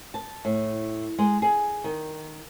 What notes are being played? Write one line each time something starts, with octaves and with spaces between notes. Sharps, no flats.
A5
A2
G#3
G#4
D#3